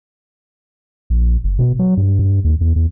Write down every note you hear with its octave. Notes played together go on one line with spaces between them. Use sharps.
A#1
F#1
B2
F#3
G2
G2
D#2
E2
E2